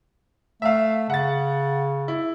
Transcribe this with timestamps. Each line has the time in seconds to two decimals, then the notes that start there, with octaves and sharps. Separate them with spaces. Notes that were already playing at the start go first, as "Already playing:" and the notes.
0.62 A3 E5 F5
1.10 C#3 F#5 A6
2.08 E4